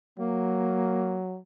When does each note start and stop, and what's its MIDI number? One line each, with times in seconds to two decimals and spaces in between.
0.19 1.39 54
0.19 1.21 58